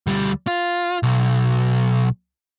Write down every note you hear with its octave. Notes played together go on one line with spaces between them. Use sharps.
D2 G3
F4
B1